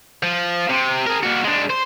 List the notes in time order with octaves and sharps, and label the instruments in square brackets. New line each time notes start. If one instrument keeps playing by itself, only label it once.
[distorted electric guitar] F3
C3
G#4 A#4
A#3 F#4
G#3 D4
C5